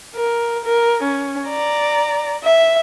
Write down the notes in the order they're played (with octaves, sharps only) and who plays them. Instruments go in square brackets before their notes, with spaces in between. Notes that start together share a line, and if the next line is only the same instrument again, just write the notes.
[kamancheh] A#4
A#4
C#4
D5 A#5
E5